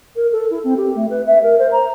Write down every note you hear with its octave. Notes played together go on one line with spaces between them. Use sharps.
A#4
A4
E4
C4
G4
A3
B4
E5
A#4
C5
A#5